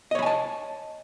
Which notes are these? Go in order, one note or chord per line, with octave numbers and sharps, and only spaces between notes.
C#5 D#5 G#5 A5 B5